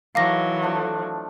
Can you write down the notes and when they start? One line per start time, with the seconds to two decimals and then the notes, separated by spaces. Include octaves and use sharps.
0.15 D#3 E3 F#3 A4 F5 D6 A#6
0.62 F3 A3 D4